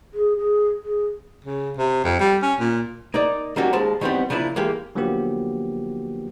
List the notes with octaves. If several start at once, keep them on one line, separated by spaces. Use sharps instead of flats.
G#4
G#4
G#4
C#3
C3
F2
G3
C#4
A#2
A#3 D#4 D5
D#3 F#3 G3 A#3 C#4 F#4
D#2 G#3 C5 A5
D#3 E3 G3 B3 C4
C#3 F3 A#3 D4 E4
E3 G#3 A#3 G4
D3 F3 F#3 A#3 B3 G4